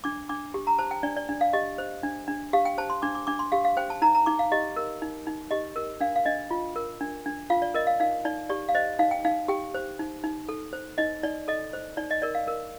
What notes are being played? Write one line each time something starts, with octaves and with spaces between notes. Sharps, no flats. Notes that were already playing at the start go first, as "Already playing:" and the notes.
D4 D6
D4 D6
G4
A#5
C5 A5
G5
D4 D5
D5
D4
F5
G4 D#5
C5
D4
D4
G4 F5
G5
C5 A5
C6
D4 D6
D6
D4 D6
C6
G4 F5
F5
C5 G5
A5
D#4 A#5
A#5
D#4 D6
F5
G4 D#5
A#4
D#4
D#4
G4 D#5
A#4
D4 F5
F5
D4 D#5
F4
A#4
D4
D4
F4 F5
D5
A#4 D#5
F5
D#4 F5
D#4 D5
G4 D5
F5
C5 D#5
D#4 F5
G5
D#4 F5
G4 G5
C5
D#4
D#4
A4
C5
D#4 D#5
D#4 D5
A4 D#5
C5
D#4 D5
D#5
A#4 D5
F5
A#4